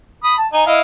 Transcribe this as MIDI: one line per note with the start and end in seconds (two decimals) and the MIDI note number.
0.24 0.35 83
0.24 0.35 87
0.38 0.47 81
0.53 0.65 63
0.53 0.65 80
0.66 0.81 64
0.66 0.81 75
0.66 0.81 77